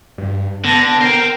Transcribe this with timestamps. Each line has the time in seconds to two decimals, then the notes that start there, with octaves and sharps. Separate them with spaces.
0.18 G2
0.64 D3 B3 A5 A#6
1.01 A#4 C5 G5